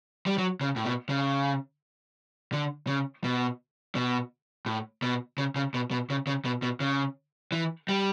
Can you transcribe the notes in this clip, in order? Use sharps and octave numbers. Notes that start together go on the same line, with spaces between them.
G3
F#3
C#3
A2
B2
C#3
D3
C#3
B2
B2
A2
B2
C#3
C#3
B2
B2
C#3
C#3
B2
B2
C#3
E3
G3